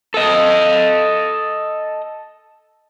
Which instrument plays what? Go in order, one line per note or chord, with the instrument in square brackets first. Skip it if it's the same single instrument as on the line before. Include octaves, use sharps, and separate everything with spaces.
[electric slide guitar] A4 D#5